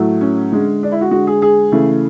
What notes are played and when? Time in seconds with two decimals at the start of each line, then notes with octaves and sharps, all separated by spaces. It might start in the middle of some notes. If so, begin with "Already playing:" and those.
Already playing: A2 F#3 A3
0.21 C#4
0.52 D3 G#3
0.83 D4
0.92 E4
1.01 F#4
1.11 D3 G#3 F#4
1.27 G#4
1.42 G#4
1.72 C#3 E3 A3